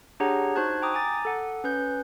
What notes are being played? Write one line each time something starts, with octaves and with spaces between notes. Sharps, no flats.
D4 G4 G#4 C#5 F#5 A#5
D#4 F#4 C5 A5 F#6 G#6
G5 A#5 D6 D#6
G#5 A#5 D6 A6
A4 F#5
C#4 B4 G6